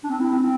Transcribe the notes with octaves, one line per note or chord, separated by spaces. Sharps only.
D4
C4
E4
C4